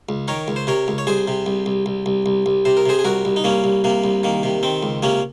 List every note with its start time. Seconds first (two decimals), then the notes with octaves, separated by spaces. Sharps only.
0.09 C#2
0.28 D#3 A#4 C#5
0.48 C#2
0.56 C5
0.67 C3 A#4 C#5
0.88 C#2
0.98 C#5
1.07 C2 G#4 C5
1.28 C3
1.46 C2
1.66 C2
1.86 C2
2.06 C2
2.26 C2
2.46 C2
2.65 C3 C5
2.77 A#4
2.86 C3 G#4 C5
2.99 G#4
3.05 C2 F#4 A#4
3.25 C2
3.36 D#4
3.44 C2 A#3 C#4
3.64 C2
3.84 C3 A#3
4.04 C2
4.24 D#3 A#3
4.43 C3
4.63 D#3 C4
4.83 C#2
5.03 C3 A#3 C#4